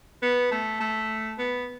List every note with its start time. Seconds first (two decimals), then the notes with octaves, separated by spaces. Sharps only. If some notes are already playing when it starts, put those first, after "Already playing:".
0.22 B3
0.51 A3
0.80 A3
1.38 B3